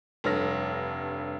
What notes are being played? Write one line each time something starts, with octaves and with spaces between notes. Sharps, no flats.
F1 G2 A4 C#5 F6 A#6